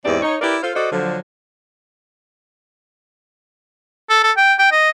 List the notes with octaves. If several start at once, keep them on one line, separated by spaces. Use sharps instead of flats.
E2 G#2 E3 C4 G4 D5
D#4 C#5
E4 G4 A#4 B4 D5
F4 A4 C5 F5
F#4 A4 C5 D5 D#5
D3 F3 F#3
A4
A4
G5
G5
D#5